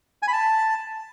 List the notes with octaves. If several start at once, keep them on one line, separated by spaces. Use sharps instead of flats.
G#5
B5
A5